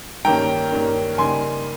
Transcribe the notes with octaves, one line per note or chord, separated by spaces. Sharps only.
G2 D#3 A#3 C#4 G5 A#5
G2 D#3 A#3 C#4
C#3 G3 A#3 D#4 G#5 C6